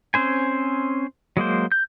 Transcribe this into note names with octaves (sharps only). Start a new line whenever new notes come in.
C4 C#4 C5 G#5
F#3 G#3 A#3 C5
G6